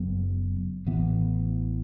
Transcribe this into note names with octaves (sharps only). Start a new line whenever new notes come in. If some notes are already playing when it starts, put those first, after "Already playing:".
Already playing: F#1 F#2 F#3 B3
A1 A2 E3 B3